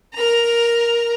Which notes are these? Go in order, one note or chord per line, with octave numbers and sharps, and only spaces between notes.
A#4 A#5